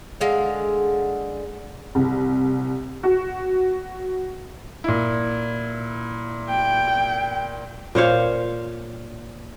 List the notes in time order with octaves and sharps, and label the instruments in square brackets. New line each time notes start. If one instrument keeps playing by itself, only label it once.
[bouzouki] D3 G#3 F5
[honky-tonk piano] C2
F#4
[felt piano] A#2 E4
[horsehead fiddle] G5
[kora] A#2 C5 C#5 F5